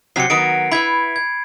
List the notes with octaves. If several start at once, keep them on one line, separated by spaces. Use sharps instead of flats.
C3 F#3 C4 C7 C#7
D#3 F#3 B3 D7
E4 B4 B5 G#6
G#6